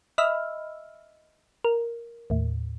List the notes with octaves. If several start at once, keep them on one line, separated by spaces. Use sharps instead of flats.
D#5 E5 B5 E6 F6
A#4
D#2 A2